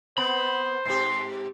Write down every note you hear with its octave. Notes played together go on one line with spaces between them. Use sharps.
B3 C5 B5
G#2 C4 G4 C6